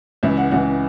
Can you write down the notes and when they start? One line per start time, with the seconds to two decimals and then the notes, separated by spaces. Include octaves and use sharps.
0.23 C#2 C#3 E3 E5
0.37 F#5
0.51 C#2 C#3 E3 F#5